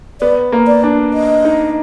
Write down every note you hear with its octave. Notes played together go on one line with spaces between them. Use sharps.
B3 D5
A#3
D5
D4
D#5
D#4